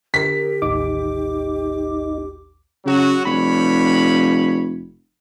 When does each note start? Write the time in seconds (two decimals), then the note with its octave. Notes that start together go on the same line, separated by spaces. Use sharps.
0.14 D3 G4 A#4 B6
0.62 A1 D#2 D#4 D6
2.85 C#3 F#3 F#4
3.26 F1 G2 C#5 B5